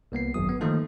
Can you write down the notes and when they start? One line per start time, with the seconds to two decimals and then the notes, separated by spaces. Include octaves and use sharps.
0.12 C2 A#3 B3 C7
0.34 G#1 F#2 F#3 D#6
0.49 B3
0.61 D#3 F3 A3 A#3 D#4 A4